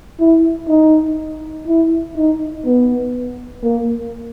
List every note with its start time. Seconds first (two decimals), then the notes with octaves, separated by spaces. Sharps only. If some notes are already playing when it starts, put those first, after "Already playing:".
0.20 E4
0.69 D#4
1.68 E4
2.17 D#4
2.66 B3
3.63 A#3